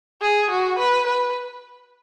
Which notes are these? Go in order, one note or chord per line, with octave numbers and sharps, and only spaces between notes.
G#4
F#4
B4
B4